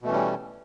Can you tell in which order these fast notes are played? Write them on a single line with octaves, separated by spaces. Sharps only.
B2 A3 E3 C#4 G3